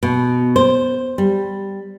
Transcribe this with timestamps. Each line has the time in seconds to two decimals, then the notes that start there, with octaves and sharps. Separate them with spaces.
0.03 B2
0.56 C5
1.18 G3